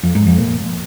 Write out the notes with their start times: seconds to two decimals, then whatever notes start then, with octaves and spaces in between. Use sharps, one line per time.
0.03 F2
0.15 G#2
0.27 F2
0.38 A#2